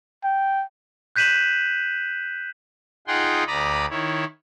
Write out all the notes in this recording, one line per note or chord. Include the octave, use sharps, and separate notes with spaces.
G5
F#6 G6 B6 D#7 E7 F#7
D#4 F4 G#4 F#5 G5 C6
D2 D5 A#5 B5 D#6
D#3 E4 C#5